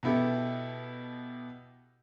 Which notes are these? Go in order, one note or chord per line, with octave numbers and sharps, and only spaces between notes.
B2 B3 E4 G4 A4